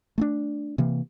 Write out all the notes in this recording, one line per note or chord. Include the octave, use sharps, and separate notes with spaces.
A3 C4 D4
C3 E3 A#3